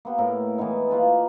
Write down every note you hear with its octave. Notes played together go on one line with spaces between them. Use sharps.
A#3 B3 G4
A2 A#3 A#4
E3 G#3 B3 D#4
A#3 F4 B4 A5